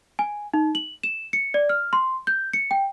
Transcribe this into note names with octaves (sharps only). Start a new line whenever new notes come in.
G#5
D#4
F#7
E7
C#7
D5
F6
C6
G6
C#7
G5